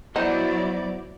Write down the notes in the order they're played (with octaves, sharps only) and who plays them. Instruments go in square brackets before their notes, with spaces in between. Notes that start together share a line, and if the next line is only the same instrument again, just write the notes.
[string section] F#3 D5 [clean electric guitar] B3 C5 F#5 [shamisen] D#4 [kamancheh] E4